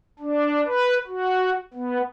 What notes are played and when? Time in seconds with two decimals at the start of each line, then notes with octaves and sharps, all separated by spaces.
0.19 D4
0.64 B4
1.07 F#4
1.74 B3